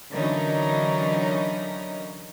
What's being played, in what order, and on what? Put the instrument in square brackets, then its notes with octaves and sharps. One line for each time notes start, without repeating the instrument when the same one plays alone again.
[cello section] D3 E3 F#3 C#4 D#4 A#4